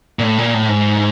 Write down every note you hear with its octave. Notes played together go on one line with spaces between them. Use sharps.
A#2
A2
A#2
A2
G#2